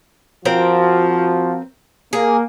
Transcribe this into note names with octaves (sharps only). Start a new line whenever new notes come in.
F3 C4 F4 F#4 A#4 F5
A#3 G#4